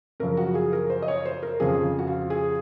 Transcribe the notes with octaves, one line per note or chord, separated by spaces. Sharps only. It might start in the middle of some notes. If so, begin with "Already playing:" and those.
F#2 C#3 F3 A#4
F#4
G#4
A#4
C5
D#5
C#5
C5
A#4
F2 C#3 F3 G#4
F#4
F4
G#4